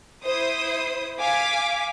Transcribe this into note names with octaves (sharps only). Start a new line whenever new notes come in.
E4 C5 D#6
F5 G#5 D6 B6